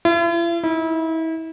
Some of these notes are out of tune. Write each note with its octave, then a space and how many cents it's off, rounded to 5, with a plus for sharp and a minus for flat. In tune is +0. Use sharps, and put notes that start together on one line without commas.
E4 +45
E4 -35